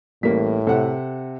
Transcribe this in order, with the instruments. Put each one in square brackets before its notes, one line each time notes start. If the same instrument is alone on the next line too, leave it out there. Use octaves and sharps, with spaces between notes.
[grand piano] A1 B6 [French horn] A2 [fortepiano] G3 A#3
[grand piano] C3 [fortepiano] A4 F#5